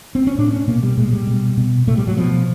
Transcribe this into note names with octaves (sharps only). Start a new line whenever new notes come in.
C4
C#4
A2 D4
C#4
B2 A#3
G3
A#2 G#3
G3
B2
B2
A2 A3
G3
F#3
B2 F3